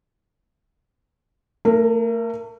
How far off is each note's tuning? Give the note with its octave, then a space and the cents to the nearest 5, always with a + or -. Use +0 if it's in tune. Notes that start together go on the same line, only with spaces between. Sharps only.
A3 +35 A#4 +0